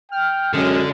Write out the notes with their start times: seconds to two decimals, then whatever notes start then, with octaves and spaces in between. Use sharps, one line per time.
0.11 G5 F6
0.54 F#2 D3 G#3